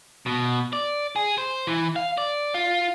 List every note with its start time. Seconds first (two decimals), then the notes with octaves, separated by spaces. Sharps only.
0.26 B2
0.73 D5
1.16 G#4
1.38 C5
1.67 E3
1.96 F5
2.18 D5
2.54 F4